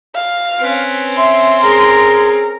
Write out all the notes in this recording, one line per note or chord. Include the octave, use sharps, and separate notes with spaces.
F5
C4 C#4 B4
E5 C6
G#4 A#4